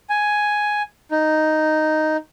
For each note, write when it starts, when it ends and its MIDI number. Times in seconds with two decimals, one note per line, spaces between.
0.10 0.82 80
1.11 2.17 63